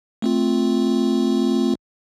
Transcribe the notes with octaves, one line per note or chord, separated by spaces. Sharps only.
A3 C4 F4